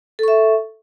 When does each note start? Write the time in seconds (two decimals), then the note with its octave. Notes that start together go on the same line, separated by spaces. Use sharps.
0.19 A4
0.23 C#6
0.28 E5